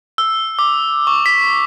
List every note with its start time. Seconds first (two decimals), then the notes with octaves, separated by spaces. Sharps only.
0.18 E6
0.59 D6
1.07 C#6
1.26 B6